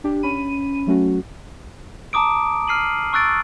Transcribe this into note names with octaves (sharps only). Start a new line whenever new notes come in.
D4 G4
C#4 B5 D#7
F#3 A3 C#4 F#4
A5 A#5 D6 D#6 D7
F6 C7 D#7 F#7
C#6 E6 F#6 A6 D7